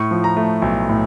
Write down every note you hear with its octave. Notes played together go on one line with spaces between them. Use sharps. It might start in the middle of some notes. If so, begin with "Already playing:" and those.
Already playing: A2 C#6
F3
A#5
A3
B1
A2